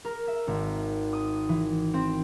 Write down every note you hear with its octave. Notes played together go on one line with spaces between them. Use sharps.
A#4
E5
G#1
D#6
E3
C4